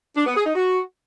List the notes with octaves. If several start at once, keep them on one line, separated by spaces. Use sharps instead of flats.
D4
B3
G#4
D#4
F#4